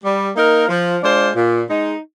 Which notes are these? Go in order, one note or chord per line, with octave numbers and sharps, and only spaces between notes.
G3
A#3 D#4 A#4
F3
G#3 D4 F4 C5
A#2
G#3 D#4